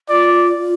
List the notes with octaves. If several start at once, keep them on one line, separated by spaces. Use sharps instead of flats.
F4 D5